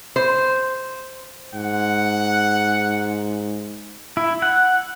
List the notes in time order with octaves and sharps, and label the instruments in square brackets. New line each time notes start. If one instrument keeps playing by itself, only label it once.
[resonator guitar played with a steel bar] C5
[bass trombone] G#2 [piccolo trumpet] F#5
[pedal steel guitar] E4
F#5